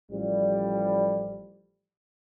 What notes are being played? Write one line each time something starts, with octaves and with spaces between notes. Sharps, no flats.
A1 F3 G3